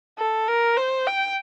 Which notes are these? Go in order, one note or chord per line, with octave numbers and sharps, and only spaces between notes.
A4
A#4
C5
G5